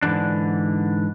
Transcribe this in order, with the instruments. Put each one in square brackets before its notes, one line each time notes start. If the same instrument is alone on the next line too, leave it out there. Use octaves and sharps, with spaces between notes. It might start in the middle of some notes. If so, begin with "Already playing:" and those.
[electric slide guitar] G#2 D3 E3 D4